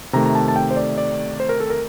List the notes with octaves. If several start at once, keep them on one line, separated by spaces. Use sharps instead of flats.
C3 D#3 A3 A#5
A#5
A5
A5
G5
C5
D5
D5
C5
A#4
A4
A#4